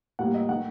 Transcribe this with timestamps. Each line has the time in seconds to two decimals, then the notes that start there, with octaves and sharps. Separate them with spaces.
0.19 A2 G3 A#3 F#5
0.34 D#5
0.49 D#3 A3 F#5